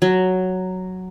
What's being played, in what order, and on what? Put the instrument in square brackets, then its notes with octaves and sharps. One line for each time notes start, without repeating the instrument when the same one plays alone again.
[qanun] F#3